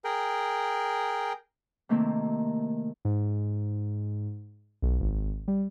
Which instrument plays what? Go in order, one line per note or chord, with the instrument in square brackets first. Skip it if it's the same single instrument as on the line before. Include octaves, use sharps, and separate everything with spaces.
[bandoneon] G#4 A#4 G5
[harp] C3 D#3 A3 A#3 C4
[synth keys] G#2
B1
G#1
G3